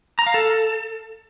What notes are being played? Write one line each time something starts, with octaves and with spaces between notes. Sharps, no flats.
A#5
F5
A4